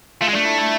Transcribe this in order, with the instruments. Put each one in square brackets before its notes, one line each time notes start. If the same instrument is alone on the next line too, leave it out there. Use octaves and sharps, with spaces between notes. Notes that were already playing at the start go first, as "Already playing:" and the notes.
[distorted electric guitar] A3 [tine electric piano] F4
[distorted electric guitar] G#3
[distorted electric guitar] A3 [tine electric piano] D4
[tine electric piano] E4
E4